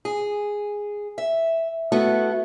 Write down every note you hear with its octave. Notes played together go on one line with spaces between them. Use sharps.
G#4
E5
A3 B3 E4 F#4 A4